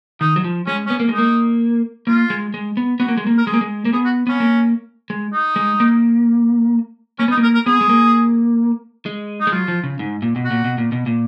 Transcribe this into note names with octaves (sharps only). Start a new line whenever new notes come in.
D#3 D#4
F#3
F3
G#3 C#4
C#4
B3
A#3
G#3
A#3 D#4
A#3 F4
G#3
G#3
B3
B3 F#4
A#3
G#3
A#3
A#4
G#3 G#4
A#3
G#3
A#3
B3 G#4
F#4
B3 C#4
A#3
G#3
D#4
G#3
A#3
A#3 C#4
B3 D#4
A#3
A#4
A#4
B3 G#4
G#3
A#3
G#3
D#4
G#3
F#3 F4
F3
C#3
G#2
A#2
B2
F#4
A#2
B2
A#2
B2
A#2